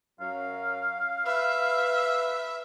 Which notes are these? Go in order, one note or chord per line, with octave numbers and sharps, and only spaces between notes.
F#2 F#3 F5
B4 E5